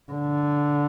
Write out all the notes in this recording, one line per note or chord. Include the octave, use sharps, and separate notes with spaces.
D3